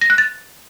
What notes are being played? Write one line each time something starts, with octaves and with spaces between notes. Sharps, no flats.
A#6
F#6
A6